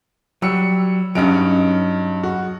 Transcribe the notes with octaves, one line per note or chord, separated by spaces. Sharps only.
F#3 G3 E6 C#7
G2 F#3 C#4 D#4 D7
F#4